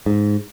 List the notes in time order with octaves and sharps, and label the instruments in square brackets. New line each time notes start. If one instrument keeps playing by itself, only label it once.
[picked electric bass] G#2